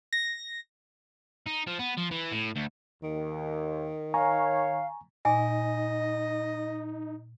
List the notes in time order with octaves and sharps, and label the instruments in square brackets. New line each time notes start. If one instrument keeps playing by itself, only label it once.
[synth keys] A#6
[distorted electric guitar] D#4
F3
B3
F3
E3
A2
D2
[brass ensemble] D#2 [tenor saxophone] D#3
[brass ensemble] C#5 [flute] F5 [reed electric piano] G#5 A#5 C#6
[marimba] A#2 [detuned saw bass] D#4 [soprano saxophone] D#5 [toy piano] G#5